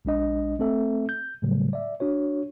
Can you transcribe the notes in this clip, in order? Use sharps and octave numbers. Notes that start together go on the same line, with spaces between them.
A#1 G#3 D4 D#5
A3 C4 A4 E5
G6
A2 C#3 F#3 G3 A3
D5 E5
D4 F#4 C#5